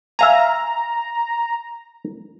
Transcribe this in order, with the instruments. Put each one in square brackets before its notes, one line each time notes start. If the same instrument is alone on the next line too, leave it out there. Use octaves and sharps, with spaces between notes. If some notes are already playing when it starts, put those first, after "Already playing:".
[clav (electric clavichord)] E5 F5 G#5 [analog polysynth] A#5